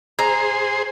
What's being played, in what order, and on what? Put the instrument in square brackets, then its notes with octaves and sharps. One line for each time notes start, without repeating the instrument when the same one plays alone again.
[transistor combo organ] G#4 C5 [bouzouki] A#5